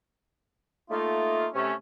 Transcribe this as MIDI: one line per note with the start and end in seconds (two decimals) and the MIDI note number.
0.90 1.47 57
0.90 1.47 58
0.90 1.47 63
0.90 1.47 65
1.54 1.73 48
1.54 1.73 57
1.54 1.73 61